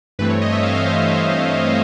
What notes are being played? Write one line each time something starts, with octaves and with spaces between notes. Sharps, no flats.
G2 E3 A3 C4 B4
C#5
D#5
E5
F5
F5
C5